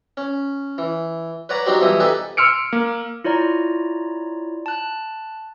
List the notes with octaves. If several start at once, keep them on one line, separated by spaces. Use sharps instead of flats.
C#4
E3
B4 C#5 D5 F#5 A#5
F#3 D4 D#4 F#4 G4 C5
B2 E3 F3 G3 E4 D#6
D#4 G4 A4 B4 G#5
C6 E6 F6 C#7 D7
A#3
E4 F4 C#5 D5 A#5
A5 F#6